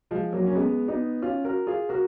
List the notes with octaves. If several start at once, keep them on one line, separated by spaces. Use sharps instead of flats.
F3 G#3
F#3 A#3
C#4
G#3 B3
B3 D#4
C#4 F4
F#4 A#4
F4 G#4
F#4 A#4